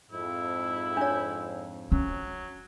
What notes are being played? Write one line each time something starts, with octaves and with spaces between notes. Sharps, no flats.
F2 G#2 E4
D4 C#5
F#3 C#4